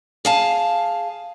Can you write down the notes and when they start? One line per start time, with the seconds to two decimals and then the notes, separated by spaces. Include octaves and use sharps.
0.25 G#4 F5 A5